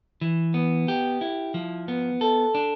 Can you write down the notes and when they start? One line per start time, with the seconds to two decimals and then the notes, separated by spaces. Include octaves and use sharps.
0.21 E3
0.54 B3
0.88 G4
1.21 E4
1.54 F3
1.88 B3
2.21 A4
2.55 D4